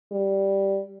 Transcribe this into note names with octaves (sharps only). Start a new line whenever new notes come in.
G3